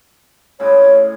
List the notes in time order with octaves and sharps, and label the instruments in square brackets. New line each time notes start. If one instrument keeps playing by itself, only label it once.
[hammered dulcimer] A2 C#3 G#3 [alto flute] C#5